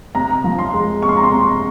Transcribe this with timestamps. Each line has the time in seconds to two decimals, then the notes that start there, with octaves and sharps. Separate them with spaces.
0.15 C3 A#5
0.44 F3
0.59 C6
0.73 G#3
1.02 C3 C#6
1.09 C6
1.17 A#5
1.24 C6
1.32 C3